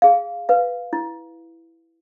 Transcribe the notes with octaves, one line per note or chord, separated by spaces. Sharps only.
G#4 F5
B4 F5
E4